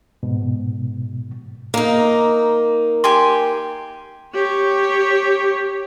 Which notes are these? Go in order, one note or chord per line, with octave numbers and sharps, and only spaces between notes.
G#2 B2
A#3 D#4
G4 G#5 C6
G4 C#5